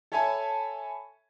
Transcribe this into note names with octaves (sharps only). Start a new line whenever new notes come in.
A4 C#5 E5 G#5 A5 B5